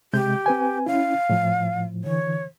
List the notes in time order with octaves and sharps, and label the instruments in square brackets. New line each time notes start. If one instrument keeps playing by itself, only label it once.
[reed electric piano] C3 G#3 G6 [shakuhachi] G4
[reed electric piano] C4 B4 G#5
[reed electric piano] C#4 E4 [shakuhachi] F5
[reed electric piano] A2 F3
[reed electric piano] D3 E3 [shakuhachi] C#5